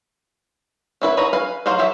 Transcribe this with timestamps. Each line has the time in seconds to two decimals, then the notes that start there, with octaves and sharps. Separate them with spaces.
1.02 C#4 E4 B4
1.17 B4 C#5 D#5 A#5
1.33 B4 F5 G#5
1.66 F#3 D#4 C5 F5
1.79 F#3 G4 E5